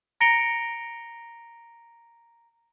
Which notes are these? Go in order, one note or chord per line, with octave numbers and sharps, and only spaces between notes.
A#5 A#6 C#7 D7 F7 G7